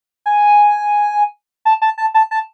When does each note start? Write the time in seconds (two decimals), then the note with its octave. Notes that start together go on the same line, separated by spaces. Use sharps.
0.26 G#5
1.65 A5
1.82 A5
1.98 A5
2.14 A5
2.31 A5